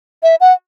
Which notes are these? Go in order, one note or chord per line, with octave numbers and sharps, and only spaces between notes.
E5
F#5